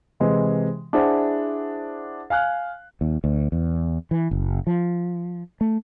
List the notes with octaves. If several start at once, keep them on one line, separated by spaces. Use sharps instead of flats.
C3 E3 G#3
D4 E4 G#4 C5 F#5
F5 G#5 F6 F#6
D#2
D2
E2
E3
F#1
F3
A3